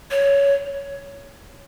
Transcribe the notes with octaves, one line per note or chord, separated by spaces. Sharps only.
C#5